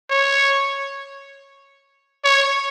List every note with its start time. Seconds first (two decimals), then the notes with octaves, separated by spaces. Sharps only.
0.10 C#5
2.24 C#5